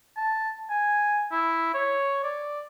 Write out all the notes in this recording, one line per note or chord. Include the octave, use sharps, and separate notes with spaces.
A5
G#5
E4
C#5
D5